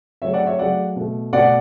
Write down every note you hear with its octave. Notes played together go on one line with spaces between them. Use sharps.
C#3 F#3 A3 C#5 E5
D5 F#5
C#5 E5
C#3 F#3 A3 D5 F#5
B2 A3
B2 A3 D5 F#5